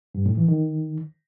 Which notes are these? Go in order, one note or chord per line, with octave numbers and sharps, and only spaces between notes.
G2
A2
E3
D#3